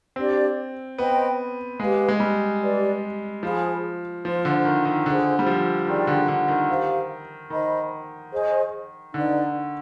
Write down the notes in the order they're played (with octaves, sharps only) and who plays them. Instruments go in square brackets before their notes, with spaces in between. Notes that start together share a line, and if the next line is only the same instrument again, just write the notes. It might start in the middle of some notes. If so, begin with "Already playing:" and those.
[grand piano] C4 [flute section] D4 G4 D5
[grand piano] B3 [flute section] C5 D#5 G5 B5
[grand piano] G#3 [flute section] G4 B4 F5
[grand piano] G#3
G3
[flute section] G4 B4 D5
[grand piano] F3 [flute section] G#4 C5 F5 B5
[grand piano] F3 [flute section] C5 F5 C6
[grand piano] D3
D#3
D#3
[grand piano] D3 [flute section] F4 G#4 C5
[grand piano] G3
F3
[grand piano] D#3 [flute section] G#4 D5 G5 C6
[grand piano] D3
D3
D#3
[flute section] G4 C5 F5
[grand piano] D#3 [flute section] C5 D#5 B5
[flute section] G#4 C5 D#5 G#5
[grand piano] D3 [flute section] D#4 B4 D5